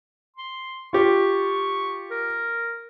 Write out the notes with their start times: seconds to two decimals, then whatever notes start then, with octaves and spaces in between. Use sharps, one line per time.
0.36 C6
0.93 F4 G4 C#6
2.11 A#4